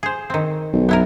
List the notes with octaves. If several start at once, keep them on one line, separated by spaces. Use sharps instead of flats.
G#4 C5
D#3 C4
B1
B3 E4 A#4